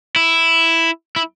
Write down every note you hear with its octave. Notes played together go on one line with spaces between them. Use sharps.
E4
E4